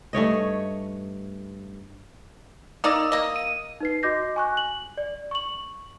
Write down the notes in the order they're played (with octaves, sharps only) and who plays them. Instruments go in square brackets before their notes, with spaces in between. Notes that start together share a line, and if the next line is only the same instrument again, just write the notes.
[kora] G2 A3 C#5 D#5
[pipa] A#3 D#4 D5 [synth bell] D#6 E6
[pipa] A#3 D#5
[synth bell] D#7
[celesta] D#4 B4 C7
F#4 D#5 D6 G6 A#6
G#5 C#6 F#6
F#7
D5
C#6 F#7